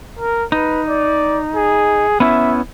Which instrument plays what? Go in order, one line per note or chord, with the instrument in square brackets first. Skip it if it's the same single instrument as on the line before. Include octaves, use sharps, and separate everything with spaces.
[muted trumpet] A#4
[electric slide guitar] D#4 [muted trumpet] B4
[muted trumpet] D5
G#4
[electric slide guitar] B3 C#4 E4 [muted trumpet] E5